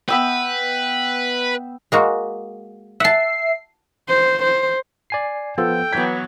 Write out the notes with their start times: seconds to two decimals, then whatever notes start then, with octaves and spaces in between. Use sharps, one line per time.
0.09 B3 B4 E5 G5
1.92 G#3 A#3 F#4
3.00 E5 F#5 A5 C7
4.09 C5
4.43 C5
5.10 D5 G#5 C7
5.58 F3 B3 F4 A4 G5
5.93 E3 F#3 B3 G#6 B6